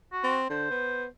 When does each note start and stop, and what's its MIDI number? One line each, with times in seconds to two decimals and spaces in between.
0.12 0.37 66
0.24 0.50 60
0.50 0.69 50
0.50 1.04 72
0.71 1.07 59